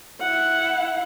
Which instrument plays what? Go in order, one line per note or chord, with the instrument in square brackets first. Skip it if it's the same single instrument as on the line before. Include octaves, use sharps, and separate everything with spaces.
[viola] E4 F#5